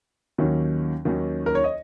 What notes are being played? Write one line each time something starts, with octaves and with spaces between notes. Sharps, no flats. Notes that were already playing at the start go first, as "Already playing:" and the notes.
D#2 D#3 F#3 C#4
D#2 D#3 F#3 C#4
A#4
C#5
D#5